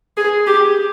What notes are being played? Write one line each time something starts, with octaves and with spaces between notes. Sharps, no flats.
G#4
G4